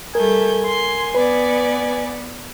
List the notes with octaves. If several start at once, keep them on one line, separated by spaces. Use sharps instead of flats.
G3 A3 A#4 G#5 G6
C6
B3 B4 D5